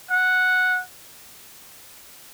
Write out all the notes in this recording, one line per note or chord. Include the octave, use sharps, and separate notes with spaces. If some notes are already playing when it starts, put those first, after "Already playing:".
F#5